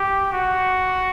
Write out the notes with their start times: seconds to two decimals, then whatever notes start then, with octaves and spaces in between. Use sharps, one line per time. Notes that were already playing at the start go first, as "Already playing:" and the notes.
Already playing: G4
0.33 F#4